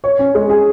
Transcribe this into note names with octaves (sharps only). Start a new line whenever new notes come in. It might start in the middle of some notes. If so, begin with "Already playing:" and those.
C#5
C#4
G#3
G#4